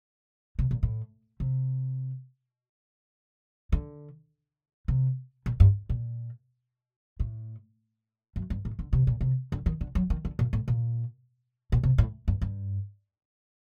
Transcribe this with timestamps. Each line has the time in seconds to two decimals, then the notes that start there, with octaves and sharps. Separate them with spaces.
0.59 C3
0.71 A#2
0.83 A2
1.40 C3
3.72 D3
4.88 C3
5.46 A#2
5.60 G2
5.89 A#2
7.20 A2
8.36 F#2
8.50 G2
8.65 A2
8.79 D3
8.93 C3
9.07 A#2
9.21 C3
9.52 D3
9.66 D#3
9.81 D3
9.95 F#3
10.10 D#3
10.25 D3
10.39 A#2
10.53 A2
10.68 A#2
11.72 A#2
11.83 C3
11.98 A2
12.28 G2
12.41 G2